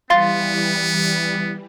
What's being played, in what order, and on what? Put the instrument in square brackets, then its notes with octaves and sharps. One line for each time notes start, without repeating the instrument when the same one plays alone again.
[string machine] E3 G3 [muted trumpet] B3 [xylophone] F5 C6 A6